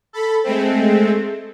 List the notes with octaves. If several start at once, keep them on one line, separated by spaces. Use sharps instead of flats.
A4 B5
G#3 A3 C4